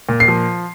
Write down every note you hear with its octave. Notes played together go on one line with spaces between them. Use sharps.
A#2
C7
F3